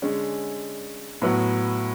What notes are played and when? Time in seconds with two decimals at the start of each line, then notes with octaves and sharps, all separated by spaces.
0.02 D3 G#3 C#4
1.22 A2 F#3 B3 F#4